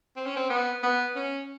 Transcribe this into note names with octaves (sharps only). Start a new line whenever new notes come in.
C4
C#4
C4
B3
B3
C#4